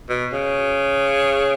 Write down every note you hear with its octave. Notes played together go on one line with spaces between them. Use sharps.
B2
C#3